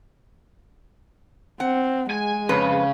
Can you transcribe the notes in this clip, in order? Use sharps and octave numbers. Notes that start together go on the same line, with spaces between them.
C4 F#5
G#3 G#5
F2 C#3 B4